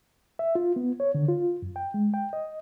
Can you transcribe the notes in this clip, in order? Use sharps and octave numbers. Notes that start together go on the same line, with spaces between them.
E5
F4
B3
C#5
D3
F4
F#2
G5
G#3
G5
D#5